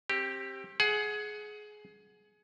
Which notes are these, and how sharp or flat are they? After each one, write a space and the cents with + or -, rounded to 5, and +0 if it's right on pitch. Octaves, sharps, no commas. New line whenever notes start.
C4 +30 G4 +0
G#4 +20 F#5 +0